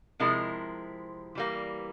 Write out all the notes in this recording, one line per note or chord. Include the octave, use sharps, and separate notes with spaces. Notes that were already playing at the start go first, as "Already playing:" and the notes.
C3 F3 G#3 E4 A#4
E3 G3 A#3